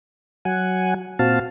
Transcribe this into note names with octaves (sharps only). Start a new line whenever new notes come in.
F#3 F#5 G#5
A#2 C4 F#4 F5 A5